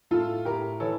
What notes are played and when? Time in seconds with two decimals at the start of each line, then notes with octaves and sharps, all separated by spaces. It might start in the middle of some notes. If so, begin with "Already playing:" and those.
0.11 A2 F4 A4
0.45 A2 G4 A#4
0.80 E3 A4 C#5